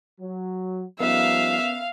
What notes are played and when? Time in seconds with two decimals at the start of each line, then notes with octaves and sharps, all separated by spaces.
0.20 F#3
1.00 F3 G3 B3 C#4 D#4 A#4 E5 F5